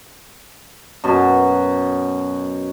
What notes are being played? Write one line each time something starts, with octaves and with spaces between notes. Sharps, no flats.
F#2 B2